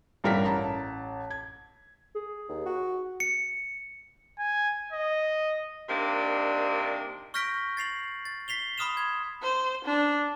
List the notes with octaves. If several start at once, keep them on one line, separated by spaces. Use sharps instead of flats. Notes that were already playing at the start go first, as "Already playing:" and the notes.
A1 G2 G3 A#4 A#5 B6
A1 A5 A#5
G#6
G#4
D#2
F#4
C#7
G#5
D#5
C3 D#3 A#3 D4
C#6 F6 G6 A#6 B6 D7
A6 C7 F7 F#7
A6
B6 C7 F7 G7
B5 C6 D#6 F6 E7 F7
G#6
C5
D4